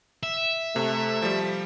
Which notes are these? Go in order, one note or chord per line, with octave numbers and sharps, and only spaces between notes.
E5
C3 A3
F3 G3